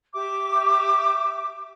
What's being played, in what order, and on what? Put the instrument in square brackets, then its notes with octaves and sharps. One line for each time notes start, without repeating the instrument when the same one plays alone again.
[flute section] G4 E5 D6